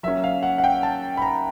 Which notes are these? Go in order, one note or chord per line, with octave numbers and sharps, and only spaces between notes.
F#3 A#3 C#4 E5
F5
F#5
F#5
G5
A5
B5
A#5